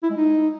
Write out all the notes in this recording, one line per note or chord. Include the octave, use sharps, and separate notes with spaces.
E4
G#3
D#4